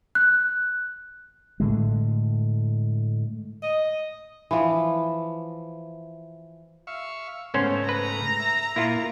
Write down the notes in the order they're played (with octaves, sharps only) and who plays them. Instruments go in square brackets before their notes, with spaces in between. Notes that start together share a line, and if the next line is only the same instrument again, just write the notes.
[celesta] F#6
[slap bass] A2 D3 G#3
[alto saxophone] D#5
[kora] E3 F3
[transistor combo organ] E5 F5 C#6
[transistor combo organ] G#2 C#3 A3 [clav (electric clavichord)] B3 C#4 C5
[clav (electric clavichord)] B4 [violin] A#5
[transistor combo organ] E5
[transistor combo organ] A#2 A#3 [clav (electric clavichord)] E4 F4